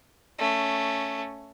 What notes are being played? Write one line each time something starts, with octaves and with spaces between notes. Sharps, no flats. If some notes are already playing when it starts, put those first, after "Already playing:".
A3 C#4